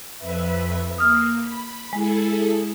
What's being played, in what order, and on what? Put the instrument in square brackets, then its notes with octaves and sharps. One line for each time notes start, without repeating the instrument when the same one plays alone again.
[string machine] F2 B4 E5
[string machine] A#3 [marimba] D#6 F6
[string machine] B5
[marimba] G#3 [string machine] E4 G#4 A4